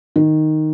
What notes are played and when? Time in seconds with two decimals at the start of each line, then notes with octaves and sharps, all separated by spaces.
0.16 D#3